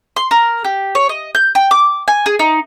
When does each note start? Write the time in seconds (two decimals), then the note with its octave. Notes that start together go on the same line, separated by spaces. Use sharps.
0.16 C6
0.31 A#4
0.64 G4
0.95 C#5
1.09 D#5
1.35 G6
1.55 G5
1.71 D6
2.08 G#5
2.26 G#4
2.39 D#4